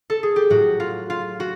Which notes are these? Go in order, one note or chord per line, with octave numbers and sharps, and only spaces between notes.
A4
G#4
G4
A2 F#3 F#4
F4
F4
F#4